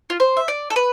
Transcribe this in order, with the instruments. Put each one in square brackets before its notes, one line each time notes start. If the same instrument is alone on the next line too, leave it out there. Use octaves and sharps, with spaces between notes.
[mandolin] F4
C5
E5
D5
A4
B4